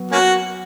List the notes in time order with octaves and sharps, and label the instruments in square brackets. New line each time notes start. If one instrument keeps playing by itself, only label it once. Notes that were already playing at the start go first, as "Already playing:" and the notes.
Already playing: [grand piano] F#3 B3
[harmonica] A#3 C#4 F#4